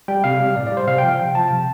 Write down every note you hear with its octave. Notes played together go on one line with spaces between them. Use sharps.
G3 G5
C3 F5
G3
A2 D5
D5
G3
C5
C3 F5
G5
F3
F5
C3 G5
F3 A5
C3